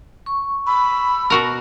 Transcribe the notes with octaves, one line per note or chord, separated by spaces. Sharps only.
C#6
B5 E6
B2 F#4 A#4